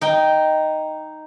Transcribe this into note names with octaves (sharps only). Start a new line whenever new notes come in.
D#4 G5